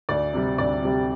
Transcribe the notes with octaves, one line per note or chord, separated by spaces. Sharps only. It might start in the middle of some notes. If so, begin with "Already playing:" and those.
D2 D5
C3 G3
D2 D5
C3 G3